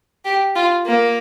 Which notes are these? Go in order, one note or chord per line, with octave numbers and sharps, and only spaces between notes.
G4
F4
A#3